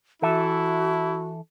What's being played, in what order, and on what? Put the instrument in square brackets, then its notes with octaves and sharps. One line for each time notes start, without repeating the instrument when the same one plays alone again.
[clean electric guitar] E3 A4 E5 [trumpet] E4 [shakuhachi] F#4